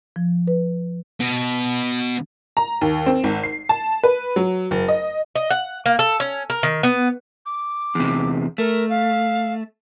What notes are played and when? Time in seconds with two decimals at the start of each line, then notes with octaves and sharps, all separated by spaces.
0.16 F3
0.47 B4
1.20 B2
2.57 A#5
2.81 D#2
3.06 C4
3.24 G#1
3.43 C7
3.69 A5
4.04 B4
4.36 F#3
4.71 F#1
4.88 D#5
5.36 D#5
5.50 F#5
5.86 A#3
5.99 A4
6.20 C#4
6.50 A#4
6.63 D#3
6.83 B3
7.46 D6
7.95 E2 C3
8.58 A3 A#4
8.89 F5